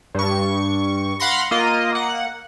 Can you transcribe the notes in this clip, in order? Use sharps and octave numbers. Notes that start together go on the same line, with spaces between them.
G2 C#6
F5 F#5 B5 C6 A#6
A#3 F4 D#5
A#3 F#5